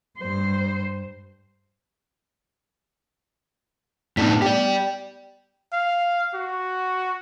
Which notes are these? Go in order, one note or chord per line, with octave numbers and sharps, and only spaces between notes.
G2 C5
A2 B3 D4 D#4 B6
G4 D5 G5
F5
F#4